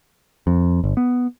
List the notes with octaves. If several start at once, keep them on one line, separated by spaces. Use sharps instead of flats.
F2
G1
B3